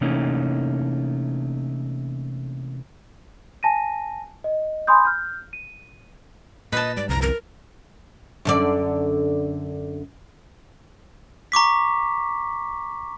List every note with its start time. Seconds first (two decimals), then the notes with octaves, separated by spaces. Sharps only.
0.01 C3 E3 A3 A#3 C#4 D#4
3.63 G#5 A5 A#6 D#7
4.44 D#5
4.87 G#5 B5 C6 D#6 G6
5.05 F6 G6
5.53 D#7
6.72 A#2 B4 D#5 A5
6.97 G#2 G3 D5
7.09 G1 C2 F2 A#5
7.22 A#4
8.45 F#2 D3 D5
11.52 A#5 C#6 D6 B6